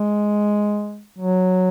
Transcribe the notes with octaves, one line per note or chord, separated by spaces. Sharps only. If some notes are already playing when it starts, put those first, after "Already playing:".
Already playing: G#3
F#3